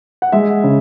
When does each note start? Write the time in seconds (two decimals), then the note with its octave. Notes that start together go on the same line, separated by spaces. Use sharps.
0.22 F#5
0.32 G#3 E5
0.64 C#3